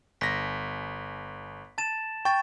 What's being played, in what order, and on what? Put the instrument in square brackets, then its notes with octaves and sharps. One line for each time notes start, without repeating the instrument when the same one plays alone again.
[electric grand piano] G1 A#6 [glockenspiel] B6
[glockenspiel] A5 A6 E7
[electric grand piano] G5 [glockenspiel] C#6 A6